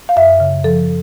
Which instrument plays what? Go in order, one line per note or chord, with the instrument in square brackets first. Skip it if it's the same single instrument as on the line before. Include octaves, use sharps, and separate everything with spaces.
[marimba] F5
F#2 E5
C#3
F3 A4